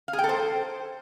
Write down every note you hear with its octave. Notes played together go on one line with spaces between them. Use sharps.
F5
G#4
G5
A4
C5